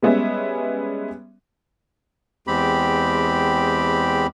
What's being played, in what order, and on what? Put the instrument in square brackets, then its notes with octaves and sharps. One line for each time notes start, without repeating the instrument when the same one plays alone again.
[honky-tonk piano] G3 G#3 B3 C#4 E5
[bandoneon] E2 G#3 C4 G4 B5